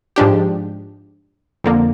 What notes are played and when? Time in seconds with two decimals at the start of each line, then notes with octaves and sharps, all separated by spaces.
0.16 G#2 F3 G#3 D4 G4
1.64 F2 D3 F3 A#3